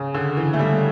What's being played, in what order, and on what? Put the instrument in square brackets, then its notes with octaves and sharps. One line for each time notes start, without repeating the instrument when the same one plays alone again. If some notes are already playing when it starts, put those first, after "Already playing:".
Already playing: [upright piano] C#3
D3
E3
A3
G3